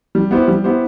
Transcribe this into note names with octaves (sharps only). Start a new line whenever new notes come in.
G3
B3 E4 G4 C5
G3
B3 E4 G4 C5